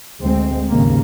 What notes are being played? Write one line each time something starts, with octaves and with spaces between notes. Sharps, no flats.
D2 G#3 C4
G#1 D#2 C#3 A#3